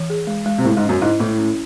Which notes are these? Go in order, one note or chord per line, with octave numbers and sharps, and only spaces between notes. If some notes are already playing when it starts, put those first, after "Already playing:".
Already playing: E3
G#4
G#3
G#3
C3
A2 G#3
G#2
C#4
F#2
G#2 E4
A2 E4
C#4